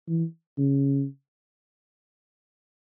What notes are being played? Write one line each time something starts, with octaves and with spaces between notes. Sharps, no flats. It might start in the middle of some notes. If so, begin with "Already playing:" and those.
E3
C#3